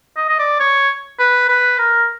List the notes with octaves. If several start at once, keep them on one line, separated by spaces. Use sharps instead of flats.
D#5
D#5
D5
C#5
B4
B4
A#4